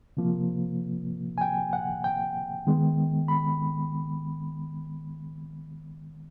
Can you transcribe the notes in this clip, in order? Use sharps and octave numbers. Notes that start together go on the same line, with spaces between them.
C3 F3 A#3
G#5
G5
F#5
G5
D#3 G#3 B3
B5